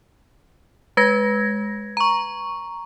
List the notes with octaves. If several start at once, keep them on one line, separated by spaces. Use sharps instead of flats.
G#3 B4 G#6 A#6
A#5 C#6